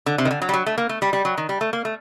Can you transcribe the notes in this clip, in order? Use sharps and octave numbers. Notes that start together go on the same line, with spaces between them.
D3
C3
D#3
D3
F#3
G3
F#3
A3
A#3
A3
G3
G3
F#3
D#3
G3
A3
A#3
A3